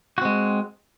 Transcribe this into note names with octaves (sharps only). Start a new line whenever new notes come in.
G#3 C4 F#4